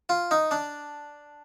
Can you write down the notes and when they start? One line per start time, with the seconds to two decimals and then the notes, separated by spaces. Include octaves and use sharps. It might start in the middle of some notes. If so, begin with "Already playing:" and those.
0.09 F4
0.31 D#4
0.51 D4